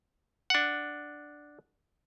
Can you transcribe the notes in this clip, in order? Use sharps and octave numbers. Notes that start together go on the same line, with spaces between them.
D4 F#5